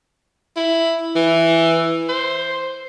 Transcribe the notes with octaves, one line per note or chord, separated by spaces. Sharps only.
E4
E3
C5